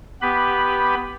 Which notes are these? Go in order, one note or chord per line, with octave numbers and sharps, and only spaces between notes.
B3 G4 B4 B5